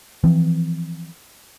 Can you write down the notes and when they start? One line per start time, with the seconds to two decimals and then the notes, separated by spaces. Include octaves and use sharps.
0.24 E3 F3 C4